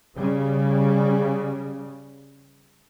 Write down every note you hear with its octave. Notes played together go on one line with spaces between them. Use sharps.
C#3 G3